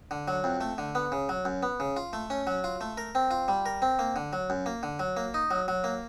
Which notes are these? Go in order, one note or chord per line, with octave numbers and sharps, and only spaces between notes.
D3
F#3
F2
A3
D3
B3
C#3
F#3
F#2
B3
C#3
F4
A3
C#4
F#3
F4
A3
A#4
C4
F4
G3
A#4
C4
A#3
D3
F#3
F#2
A#3
D3
F#3
A#3
D#4
F#3
F#3
A#3